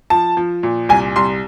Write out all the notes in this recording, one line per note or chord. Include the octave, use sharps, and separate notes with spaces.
F3 A5
F3
A#2
C2 G#5
C2 C6